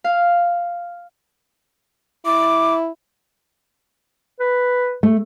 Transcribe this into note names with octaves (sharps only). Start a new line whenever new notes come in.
F5
E4 D6
B4
A3